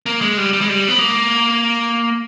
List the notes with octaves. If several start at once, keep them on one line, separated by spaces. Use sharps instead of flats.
A#3
G#3
G3
G3
G#3
G3
B3
A#3